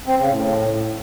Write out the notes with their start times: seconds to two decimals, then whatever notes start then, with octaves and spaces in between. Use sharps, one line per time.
0.07 C4
0.19 C#3
0.31 A2